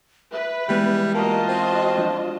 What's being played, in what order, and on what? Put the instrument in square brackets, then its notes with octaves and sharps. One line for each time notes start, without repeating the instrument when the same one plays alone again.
[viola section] B4 [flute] E5
[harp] E3 G#3 B3 [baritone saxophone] G3
[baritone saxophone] A#3 [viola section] F4 F#4 D#5 [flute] A5
[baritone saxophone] C4
[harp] F3 D4